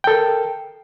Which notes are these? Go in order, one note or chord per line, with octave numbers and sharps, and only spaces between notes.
A4 A#4 G5